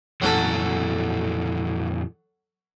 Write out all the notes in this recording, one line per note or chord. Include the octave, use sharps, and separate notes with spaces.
F2 A#2 E3 F#3 C#4 A4